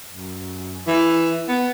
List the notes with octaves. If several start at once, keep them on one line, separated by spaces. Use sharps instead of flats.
F#2
E3
B3